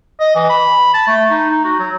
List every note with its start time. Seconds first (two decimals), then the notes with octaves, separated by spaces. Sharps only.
0.20 D#5
0.35 E3
0.49 B5
0.94 A5
1.07 A3
1.30 D#4
1.50 D#4
1.64 F#4
1.79 F#3